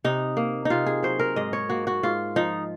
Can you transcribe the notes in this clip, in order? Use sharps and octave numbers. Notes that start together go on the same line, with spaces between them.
C3 D#4
A#3
C3 D#4 F4
G#4
F#3 C5
A#4
G#2 D#5
C#5
A#3 F#4
F#4
G#2 F4
F3 D#4